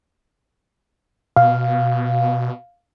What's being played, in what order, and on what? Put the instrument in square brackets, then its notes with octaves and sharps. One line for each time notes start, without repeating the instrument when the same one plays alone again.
[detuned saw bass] B2 [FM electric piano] F5